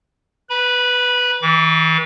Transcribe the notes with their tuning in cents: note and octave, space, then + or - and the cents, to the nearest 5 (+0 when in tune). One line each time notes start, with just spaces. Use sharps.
B4 +0 B5 -25
E3 -40 D6 -40